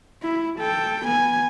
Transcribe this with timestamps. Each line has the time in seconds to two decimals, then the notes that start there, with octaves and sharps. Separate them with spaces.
0.22 E4
0.59 A4 G5
1.06 B3 G#5